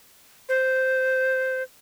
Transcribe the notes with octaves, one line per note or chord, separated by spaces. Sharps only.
C5